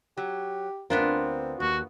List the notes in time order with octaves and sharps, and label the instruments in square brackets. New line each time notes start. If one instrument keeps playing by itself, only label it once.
[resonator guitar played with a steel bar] F#3 [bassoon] G4
[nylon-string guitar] D2 A#2 A#4 [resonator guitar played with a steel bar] B3 D4 F4 [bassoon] C4
[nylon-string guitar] D#2 [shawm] F#4